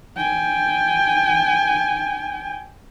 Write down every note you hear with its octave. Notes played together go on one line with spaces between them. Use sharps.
G5 G#5